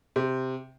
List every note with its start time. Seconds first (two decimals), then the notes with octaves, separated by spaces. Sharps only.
0.16 C3